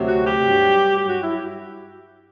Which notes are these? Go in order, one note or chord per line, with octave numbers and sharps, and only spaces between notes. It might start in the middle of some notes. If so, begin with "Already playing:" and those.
Already playing: D2 C3 F#3
F#4
G4
G2 F#3
G2 F#3 G4
F#4
E4